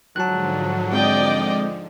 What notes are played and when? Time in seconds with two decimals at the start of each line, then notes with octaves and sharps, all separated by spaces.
0.16 G#2 D3 F3 F#3 A5 F#6
0.93 G#3 C4 D5 D#5 G5